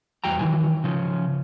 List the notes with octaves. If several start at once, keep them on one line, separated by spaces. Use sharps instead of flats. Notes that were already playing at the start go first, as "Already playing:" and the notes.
E2 G3 F#4 G5 A#5
D#3 E3 F#3 G#5
C#3 F3 C#4